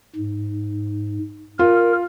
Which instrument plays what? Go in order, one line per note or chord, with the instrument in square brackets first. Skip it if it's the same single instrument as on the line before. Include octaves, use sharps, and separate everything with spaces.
[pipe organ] G#2
[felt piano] F4 [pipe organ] A#4